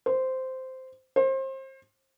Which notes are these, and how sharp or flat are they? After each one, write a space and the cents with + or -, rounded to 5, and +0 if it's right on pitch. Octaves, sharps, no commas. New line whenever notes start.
C5 -10
C5 +30